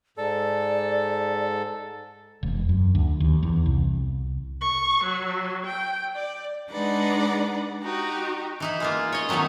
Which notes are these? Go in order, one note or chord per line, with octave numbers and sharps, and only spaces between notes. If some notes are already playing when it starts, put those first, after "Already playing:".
G#2 A4 D5
E1
F#2
D2
D#2
E2
C2
C#6
F#3
G5
D5
G#3 D4 D#4 B4 D5 F#5
D#4 F#4 G4
E3 D#4 E4
G#3 A#3 F4
C#5 D#5
D#3 F#3 A3 B3 D#4